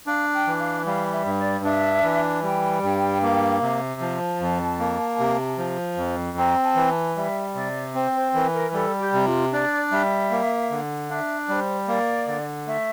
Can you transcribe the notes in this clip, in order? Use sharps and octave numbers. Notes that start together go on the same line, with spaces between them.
D4 F5
G5
E3
F5
G3 F5
E5
G2
D5
D4 E5
E3
G3 G5
G2
A#3
C3
F3 A5
F2
A#3
C3
F3
F2
C4 A#5
A5
E3
A5
G3 E5
C3 D5
C4 C5
C5
E3 A#4
A#4
G3 A4
G4
C3
F4
D4 D5
G3 E5
A#3
D3
D4 E5 F5
G3 C5 D5
A#3 D5
D3
A3 E5